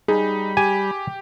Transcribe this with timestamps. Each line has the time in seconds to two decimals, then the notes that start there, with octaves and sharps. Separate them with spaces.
0.08 G3 D#4 G#4 B5
0.57 G4 G#5